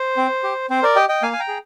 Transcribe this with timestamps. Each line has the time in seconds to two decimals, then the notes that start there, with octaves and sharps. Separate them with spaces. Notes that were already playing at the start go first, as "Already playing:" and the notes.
Already playing: C5
0.17 C4
0.43 G4
0.70 C4 C5
0.83 A#4 D5
0.96 G4 D#5 G5
1.09 D#5 G5
1.23 A#3 F5 G#5
1.33 G#5
1.40 G5 A#5
1.48 G#4